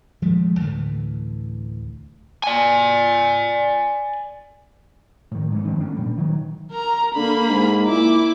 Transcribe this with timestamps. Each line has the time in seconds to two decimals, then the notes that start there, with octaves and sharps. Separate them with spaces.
0.22 D#1 F3 G#3 A3
0.61 D2 A2 D3 E3
2.44 D5 G#5
5.31 A2 D#3
5.52 G#2 E3 A3
5.67 G2 D#3 F3 C4
5.80 A3 C#4 D4
5.96 A#2 G3
6.17 D#3 F#3
6.71 A#4 A#5
7.15 D3 A#3 B5
7.48 G#2
7.87 A#2 E4 D6